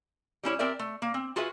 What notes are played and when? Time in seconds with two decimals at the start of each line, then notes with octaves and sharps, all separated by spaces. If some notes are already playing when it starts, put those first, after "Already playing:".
0.43 G3 C#4 E4 C#5
0.59 C4 G4 A#4 D5 E5
0.79 A3
1.02 A#3
1.14 C4
1.36 F4 F#4 G#4 B4 E5